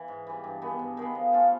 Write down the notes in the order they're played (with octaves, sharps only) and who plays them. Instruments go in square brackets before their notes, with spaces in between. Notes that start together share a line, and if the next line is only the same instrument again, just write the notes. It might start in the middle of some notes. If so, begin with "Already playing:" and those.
Already playing: [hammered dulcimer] E3
G#2
E3 G3
G2
D#3 G#3 B3
G2
D#3 G#3 B3
F3
A3 C#4 F4